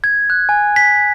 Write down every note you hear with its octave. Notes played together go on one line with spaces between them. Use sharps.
G#6
F#6
G#5
B6